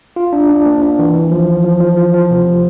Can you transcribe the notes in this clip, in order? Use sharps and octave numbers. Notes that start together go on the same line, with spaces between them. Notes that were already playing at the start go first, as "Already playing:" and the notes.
F4
D4
D4
A#3
D4
E3
E4
F3
F3
F3
F3
F3
F3
C3